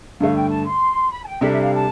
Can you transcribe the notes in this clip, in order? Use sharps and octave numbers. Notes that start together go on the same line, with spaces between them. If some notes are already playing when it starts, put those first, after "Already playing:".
G2 D3 A3 F5
G5
A5
C6
B5
A5
G5
C3 G3 D4 A4 E5
E5
F5
A5